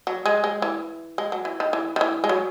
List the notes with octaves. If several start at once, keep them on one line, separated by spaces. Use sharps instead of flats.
F#3
G#3
G#3
E3
G#3
F#3
E3
D#3
E3
D#3
E3
G#3
F#3